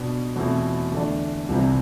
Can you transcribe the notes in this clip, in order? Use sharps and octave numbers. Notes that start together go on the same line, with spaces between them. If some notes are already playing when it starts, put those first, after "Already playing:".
Already playing: B2 B3 D4
E2 B2 A3 C4 E4
E2 D3 A3 D4
C2 C3 E3 G3 C4